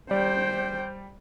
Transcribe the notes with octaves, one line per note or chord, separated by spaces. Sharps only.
G3 C5 D5 G5